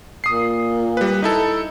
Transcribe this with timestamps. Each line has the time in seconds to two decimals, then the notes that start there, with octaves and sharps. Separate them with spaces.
0.24 A#2 D#6 C7
0.97 G3 B4
1.22 D#4 E4 A4